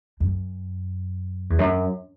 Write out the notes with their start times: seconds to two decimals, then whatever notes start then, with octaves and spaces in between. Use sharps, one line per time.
0.20 F#2
1.50 E2
1.59 F#2